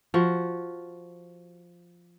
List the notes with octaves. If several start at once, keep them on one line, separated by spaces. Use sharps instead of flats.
F3 F#4